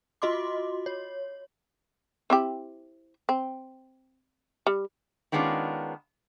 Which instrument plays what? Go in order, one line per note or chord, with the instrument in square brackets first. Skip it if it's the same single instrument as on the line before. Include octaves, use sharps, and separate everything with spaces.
[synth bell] F4 F#4 D#5 C6 D6
C#5
[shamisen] C4 E4 G4
C4
G3
[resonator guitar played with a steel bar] D#3 G#3 B3 C#4 D4 F4